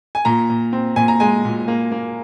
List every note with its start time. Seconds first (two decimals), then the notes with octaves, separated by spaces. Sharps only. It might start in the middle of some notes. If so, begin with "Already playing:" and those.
0.15 G#5
0.25 A#2 A#5
0.50 A#2
0.73 C4
0.96 A#2 G#5
1.08 A#5
1.20 G#3 G#5
1.45 A#2
1.68 A#3
1.92 A#3